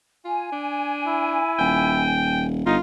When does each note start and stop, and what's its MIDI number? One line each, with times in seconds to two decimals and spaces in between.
0.25 0.49 65
0.25 2.44 80
0.53 1.40 62
1.07 2.07 64
1.59 2.66 27
1.59 2.43 79
2.66 2.78 31
2.66 2.76 63
2.66 2.81 65